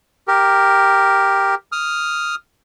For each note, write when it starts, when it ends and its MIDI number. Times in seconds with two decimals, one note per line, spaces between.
0.28 1.55 67
0.28 1.55 70
1.72 2.35 87
1.72 2.35 89